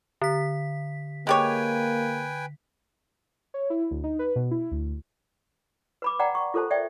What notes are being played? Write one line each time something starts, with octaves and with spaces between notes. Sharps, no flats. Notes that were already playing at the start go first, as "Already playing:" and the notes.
D3 B6
G#3 A#3 G4 B4 C#5 G5 G#5
C#5
E4
D2
D#4
B4
B2
E4
D2
B4 B5 D6
D5 F#5 G5 A#5
C#6
F4 A4 A#4 C5 A5
D5 E5 G5